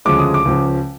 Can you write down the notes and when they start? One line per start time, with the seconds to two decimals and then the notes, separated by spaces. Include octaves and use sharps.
0.05 D2 C#3 F3 G#3 D6
0.19 D#6
0.34 D6
0.45 C#2 C#3 F3